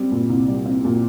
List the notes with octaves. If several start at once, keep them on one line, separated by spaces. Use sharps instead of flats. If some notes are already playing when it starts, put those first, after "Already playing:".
Already playing: G3 C4
A#2
C2
G3
C4
A#2